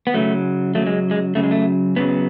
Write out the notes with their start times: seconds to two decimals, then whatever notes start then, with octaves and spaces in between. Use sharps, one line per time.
0.07 B3
0.14 F#2 C#3 F#3 A3
0.75 F#2 C#3 F#3 A3
0.87 G#3
1.11 G#3
1.35 F#2 C#3 F#3 A3
1.43 G#3
1.51 A3
1.96 F#2 C#3 F#3 B3